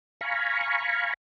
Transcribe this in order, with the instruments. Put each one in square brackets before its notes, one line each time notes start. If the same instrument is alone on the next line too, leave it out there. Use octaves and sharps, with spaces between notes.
[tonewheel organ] F5 G#5 A#5 B5 C#6